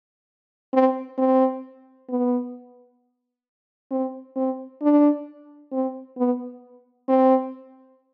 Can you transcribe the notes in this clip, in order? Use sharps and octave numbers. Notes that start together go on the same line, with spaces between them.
C4
C4
B3
C4
C4
D4
C4
B3
C4